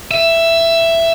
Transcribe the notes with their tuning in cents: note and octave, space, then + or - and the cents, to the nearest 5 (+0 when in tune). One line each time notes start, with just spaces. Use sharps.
E5 +10